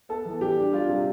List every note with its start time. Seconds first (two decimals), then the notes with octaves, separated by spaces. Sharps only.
0.09 B3 A4
0.25 E3
0.41 G3 G4
0.57 D4
0.73 G3 F4
0.89 C3